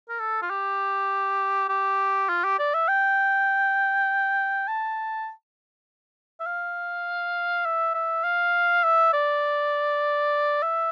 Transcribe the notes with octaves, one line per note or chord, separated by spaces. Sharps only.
A#4
A4
F4
G4
G4
F4
G4
D5
E5
G5
A5
E5
F5
E5
E5
F5
E5
D5
E5